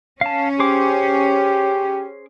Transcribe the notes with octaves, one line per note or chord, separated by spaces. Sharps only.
C#4 F5 A5
G4 G#4 C5 D6